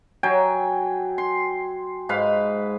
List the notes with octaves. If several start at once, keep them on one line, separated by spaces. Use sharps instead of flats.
F#3 G5 G#5
C6
G#2 B4 F5 B5